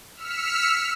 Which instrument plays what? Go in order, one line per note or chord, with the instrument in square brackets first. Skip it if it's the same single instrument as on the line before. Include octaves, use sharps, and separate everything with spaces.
[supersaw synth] E6 F6 B6 C#7